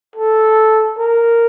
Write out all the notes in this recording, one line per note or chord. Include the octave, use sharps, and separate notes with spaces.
A4
A#4